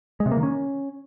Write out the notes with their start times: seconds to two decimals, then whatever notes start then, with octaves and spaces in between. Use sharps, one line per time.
0.20 G#3
0.26 C3
0.32 A#3
0.37 D#3
0.43 C#4